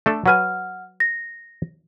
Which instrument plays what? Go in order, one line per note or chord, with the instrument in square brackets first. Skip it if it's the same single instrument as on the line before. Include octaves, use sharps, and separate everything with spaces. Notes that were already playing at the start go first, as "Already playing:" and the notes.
[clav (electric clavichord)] A3 D4 A4
[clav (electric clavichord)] F#3 B4 G#5 [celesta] F#5 F6
[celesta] A#6